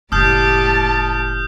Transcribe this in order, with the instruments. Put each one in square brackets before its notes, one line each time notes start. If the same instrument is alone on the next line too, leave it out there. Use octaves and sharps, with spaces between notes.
[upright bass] F#1 [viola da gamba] A2 G3 G4 [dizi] A5 [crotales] D#6 F6 G6